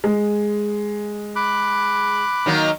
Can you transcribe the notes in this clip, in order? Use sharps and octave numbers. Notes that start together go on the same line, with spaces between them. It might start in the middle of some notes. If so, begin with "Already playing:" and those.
G#3
B5 D6 F#6
D#3 F#3 A#3